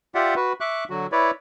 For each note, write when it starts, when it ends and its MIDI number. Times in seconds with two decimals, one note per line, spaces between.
0.15 0.35 65
0.15 0.35 67
0.15 0.35 74
0.15 0.35 76
0.15 0.35 78
0.36 0.53 66
0.36 0.53 71
0.61 0.84 76
0.61 0.84 85
0.61 0.84 86
0.61 0.84 90
0.90 1.07 50
0.90 1.07 54
0.90 1.07 66
1.12 1.31 64
1.12 1.31 71
1.12 1.31 73
1.12 1.31 74